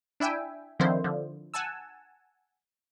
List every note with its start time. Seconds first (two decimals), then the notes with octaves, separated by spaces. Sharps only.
0.20 D4 E4 E5 G5 G#5
0.79 D3 D#3 F3 C4 E4 C5
1.04 D3 F3
1.54 F#5 G#5 A5 E6